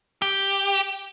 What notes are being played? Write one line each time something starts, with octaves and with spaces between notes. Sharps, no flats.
G4